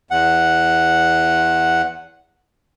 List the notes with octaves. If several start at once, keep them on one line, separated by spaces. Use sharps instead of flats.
E2 F#5